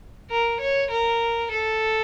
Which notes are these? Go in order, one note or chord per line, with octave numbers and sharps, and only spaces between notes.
A#4
C#5
A#4
A4